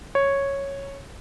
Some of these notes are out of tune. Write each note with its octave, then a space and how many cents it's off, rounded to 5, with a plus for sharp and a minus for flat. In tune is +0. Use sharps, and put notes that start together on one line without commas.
C#5 -5